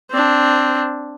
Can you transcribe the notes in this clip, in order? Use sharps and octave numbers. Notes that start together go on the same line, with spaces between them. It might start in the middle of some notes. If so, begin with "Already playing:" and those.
C4 D4